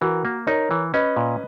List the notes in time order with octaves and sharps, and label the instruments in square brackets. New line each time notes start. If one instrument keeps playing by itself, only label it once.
[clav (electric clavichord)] E3 [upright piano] F#4 A#4
[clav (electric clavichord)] A#3
[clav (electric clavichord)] D#4 [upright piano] A#4 C#5
[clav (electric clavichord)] E3
[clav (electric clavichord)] C#4 [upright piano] B4 D#5
[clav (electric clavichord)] A#2